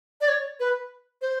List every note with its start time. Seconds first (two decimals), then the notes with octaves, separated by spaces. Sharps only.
0.21 D5
0.28 C#5
0.60 B4
1.22 C5